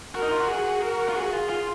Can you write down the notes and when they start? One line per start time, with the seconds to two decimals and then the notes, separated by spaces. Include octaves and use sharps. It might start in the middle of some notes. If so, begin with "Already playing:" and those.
0.14 F#4 A#4
0.23 D#4
0.31 F4
0.40 F#4
0.48 G#4
0.82 A#4
1.09 F4
1.15 F#4 G#4
1.33 F4
1.49 F4